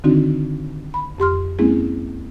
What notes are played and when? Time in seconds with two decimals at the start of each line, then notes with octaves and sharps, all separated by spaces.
0.04 D3 D#3 C4 D4 D#4 F#4
0.94 B5
1.18 F2 G4 C6 F6
1.59 G#3 A#3 C4 C#4 E4 G#4